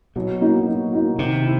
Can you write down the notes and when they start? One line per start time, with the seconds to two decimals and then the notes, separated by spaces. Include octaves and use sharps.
0.16 B2 F#3
0.41 A#3 D#4 F#4
0.67 F#3
0.93 A#3 D#4 F#4
1.19 C3 D#3
1.45 E4